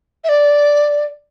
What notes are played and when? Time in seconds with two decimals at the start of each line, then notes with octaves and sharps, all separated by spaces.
0.24 E5
0.29 D5